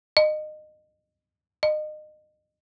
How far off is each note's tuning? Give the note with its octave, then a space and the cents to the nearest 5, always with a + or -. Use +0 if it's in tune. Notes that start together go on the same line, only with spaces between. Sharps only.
D#5 -25
D#5 -30